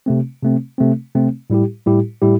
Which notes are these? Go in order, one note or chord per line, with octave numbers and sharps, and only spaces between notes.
C3 A3 C4
C3 A3 C4
C3 A3 C4
C3 A3 C4
A2 G3 E4 G4
A2 G3 E4 G4
A2 G3 E4 G4